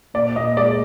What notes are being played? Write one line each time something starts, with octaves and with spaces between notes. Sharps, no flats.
A#2 D5
A#2 D#5
G#3 D5